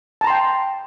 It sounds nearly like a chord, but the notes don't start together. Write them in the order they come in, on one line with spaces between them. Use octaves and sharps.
A5 A#5 C6 G5